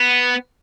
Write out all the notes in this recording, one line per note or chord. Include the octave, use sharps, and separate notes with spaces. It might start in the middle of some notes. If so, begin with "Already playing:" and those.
Already playing: B3